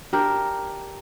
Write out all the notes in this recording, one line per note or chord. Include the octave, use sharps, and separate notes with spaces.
D4 G4 A#4